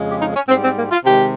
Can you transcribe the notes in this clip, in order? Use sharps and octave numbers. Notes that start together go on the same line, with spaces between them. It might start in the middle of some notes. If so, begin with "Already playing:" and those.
Already playing: F2 C#3 F3 G#3
G4
D#4
C#4
G#2 G3 C4
C4
A#3
F4
C3 D#3 G#3 G4